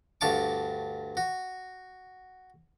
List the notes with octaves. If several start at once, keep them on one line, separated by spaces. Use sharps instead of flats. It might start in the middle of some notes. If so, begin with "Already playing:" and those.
D2 G2 F5 A5 C#6 D6
F#4